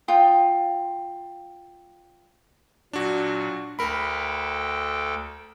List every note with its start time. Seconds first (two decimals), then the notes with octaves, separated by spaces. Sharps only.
0.08 F4 G5 D#6
2.93 A#2 F#3 D4 F#4
3.79 D2 A4 A#4 G5 B5